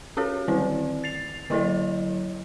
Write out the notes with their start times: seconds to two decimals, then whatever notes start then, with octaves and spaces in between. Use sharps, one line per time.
0.17 C#4 F#4 G4 A4 C#5
0.48 D3 D#3 C4 E4 D5
1.04 A6 C7 F7
1.50 D3 F#3 E4 A4 C#5 D#5